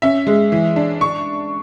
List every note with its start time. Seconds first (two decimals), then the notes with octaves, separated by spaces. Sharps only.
0.02 C#4 E5
0.27 G#3
0.52 E3
0.76 D4
1.01 C#6